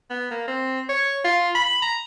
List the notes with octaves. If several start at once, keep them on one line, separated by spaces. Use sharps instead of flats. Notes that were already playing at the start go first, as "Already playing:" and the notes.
B3
A#3
C4
C#5
F4
B5
A#5